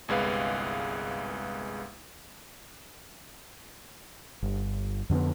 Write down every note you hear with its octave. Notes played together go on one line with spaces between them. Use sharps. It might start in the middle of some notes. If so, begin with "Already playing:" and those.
G1 C2 G#3 B4 F5
G1
F2 D3 A#3 B3